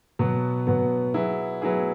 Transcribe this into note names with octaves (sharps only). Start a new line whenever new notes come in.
B2 F#3 B3
B2 F#3 B3
F#3 B3 E4 G#4
F#3 B3 E4 G#4